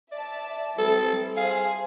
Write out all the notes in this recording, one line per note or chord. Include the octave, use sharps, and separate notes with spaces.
D5 E5 A5
G3 C4 E4 A4
G#4 C5 F5